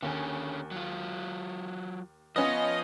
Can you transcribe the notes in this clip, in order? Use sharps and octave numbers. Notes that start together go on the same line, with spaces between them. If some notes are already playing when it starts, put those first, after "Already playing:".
D#2 D3 C#4 G#5
F#3 F4
F3 B3 C#4 F4 B4 D#5